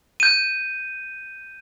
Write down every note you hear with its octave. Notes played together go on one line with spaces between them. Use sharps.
G6 D#7